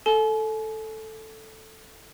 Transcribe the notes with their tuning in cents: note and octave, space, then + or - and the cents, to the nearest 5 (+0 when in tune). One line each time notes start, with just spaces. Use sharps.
A4 +0 G#5 +45